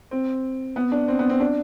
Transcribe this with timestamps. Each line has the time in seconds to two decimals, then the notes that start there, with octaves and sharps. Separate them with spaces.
0.11 C4
0.76 B3
0.92 D4
1.08 C4
1.19 B3
1.29 C4
1.40 D4